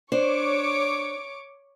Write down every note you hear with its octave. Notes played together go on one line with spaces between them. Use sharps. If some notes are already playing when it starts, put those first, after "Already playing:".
D4 C5 C#5 C#6 D6